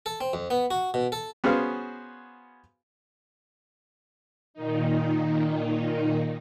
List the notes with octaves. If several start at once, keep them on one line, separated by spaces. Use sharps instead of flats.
A4
C4
F2
B3
F#4
B2
A4
B3 C#4 F#4 G#4 C5 F5
A#2 D#3 D#4